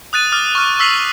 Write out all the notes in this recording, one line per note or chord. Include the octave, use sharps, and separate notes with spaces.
D#6 F#6 A6 D#7
D6 D#6 F6 A6
C#6 F6
C#6 E6 B6 C7 F7 F#7